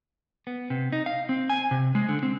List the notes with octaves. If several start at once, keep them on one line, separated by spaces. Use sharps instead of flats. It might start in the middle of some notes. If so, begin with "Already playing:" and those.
B3
C3
D#4
F5
C4
G#5
C3
G#3
D3
C4